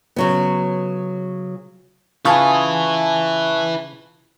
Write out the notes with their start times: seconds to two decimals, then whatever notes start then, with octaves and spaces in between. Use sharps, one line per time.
0.16 C#3 F#3 B3
2.25 C#3 E4 F4 B4 G#5 A5 C#6